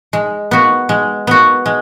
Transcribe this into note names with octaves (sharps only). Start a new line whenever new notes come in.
G#3
B3 F#4
G#3
B3 F#4
G#3